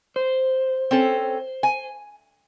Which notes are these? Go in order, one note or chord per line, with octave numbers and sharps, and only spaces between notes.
C5
C4 C#4 A4
G#5